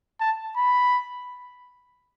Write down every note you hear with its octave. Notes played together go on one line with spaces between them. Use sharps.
A5
B5